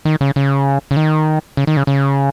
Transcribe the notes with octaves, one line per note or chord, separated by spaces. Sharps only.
D#3
C#3
C#3
C#3
D#3
C#3
D#3
C#3
C#3